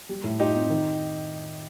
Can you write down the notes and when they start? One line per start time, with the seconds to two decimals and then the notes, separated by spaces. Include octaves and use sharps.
0.09 G3
0.24 A2
0.40 D#4 F4 G4
0.55 C4
0.70 D#3